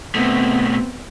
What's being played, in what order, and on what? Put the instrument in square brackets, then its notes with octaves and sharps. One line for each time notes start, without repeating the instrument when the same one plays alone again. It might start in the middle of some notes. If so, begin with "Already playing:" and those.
[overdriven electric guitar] B2 A3 [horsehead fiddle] B3 C4